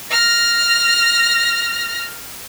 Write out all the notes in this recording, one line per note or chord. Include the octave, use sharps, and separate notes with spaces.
F6 A#6